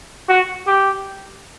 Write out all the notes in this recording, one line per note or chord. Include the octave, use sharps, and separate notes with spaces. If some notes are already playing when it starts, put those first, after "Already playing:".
F#4
G4